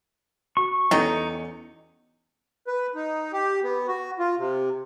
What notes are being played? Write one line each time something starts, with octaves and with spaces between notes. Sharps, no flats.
F#4 C#6
E2 F#3 B3 C#4 D#4 A4 C#7
B4
D#4
G4
B3
F#4
F4
C3